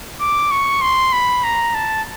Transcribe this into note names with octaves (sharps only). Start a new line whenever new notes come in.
D6
C#6
C6
B5
A#5
A5